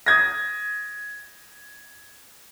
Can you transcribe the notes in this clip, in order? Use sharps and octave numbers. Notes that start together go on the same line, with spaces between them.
D#6 G#6 A#6